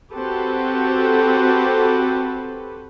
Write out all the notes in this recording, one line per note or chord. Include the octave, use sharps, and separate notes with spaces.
C4 F#4 G4 A4 B4